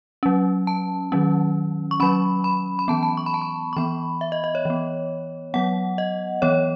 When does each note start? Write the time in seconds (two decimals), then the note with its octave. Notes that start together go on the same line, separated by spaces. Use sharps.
0.23 F#3 C#4
0.67 A5
1.12 D#3 F#3 C#4
1.91 C#6
2.00 F#3 C#4 B5
2.44 B5
2.79 B5
2.88 E3 B3 A5
3.03 A5
3.17 C#6
3.26 B5
3.34 A5
3.42 B5
3.73 C#6
3.77 E3 B3 B5
4.21 E5
4.32 D#5
4.44 D#5
4.55 C#5
4.65 E3 B3
5.54 F#3 B3 F#5
5.98 D#5
6.42 E3 B3 C#5